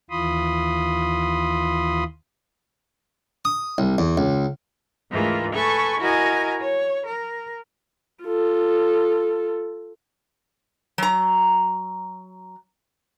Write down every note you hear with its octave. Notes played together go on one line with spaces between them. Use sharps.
D#2 E3 F4 B5 C6 D#6
D#6
C2
E2
C#2
D2 G#2 E3 A3 F4 A#4
A4 B4 G#5 C#6
E4 F#4 A#4 D#5 G#5 A#5
C#5
A#4
F4 A4
F#3 A#5